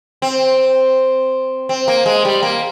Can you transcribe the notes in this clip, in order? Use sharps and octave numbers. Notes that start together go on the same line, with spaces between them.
C4
C4
A#3
G#3
G3
A#3